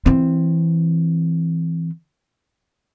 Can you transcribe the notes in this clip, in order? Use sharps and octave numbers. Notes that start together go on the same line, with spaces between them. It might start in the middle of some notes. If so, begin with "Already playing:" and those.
E3 C4